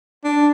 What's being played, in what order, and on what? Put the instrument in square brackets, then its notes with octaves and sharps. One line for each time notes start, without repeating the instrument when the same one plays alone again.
[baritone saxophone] D4